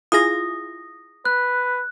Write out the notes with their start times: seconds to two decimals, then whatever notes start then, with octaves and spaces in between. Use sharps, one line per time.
0.12 E4 F4 G#4 D#6 A#6
1.25 B4 F#6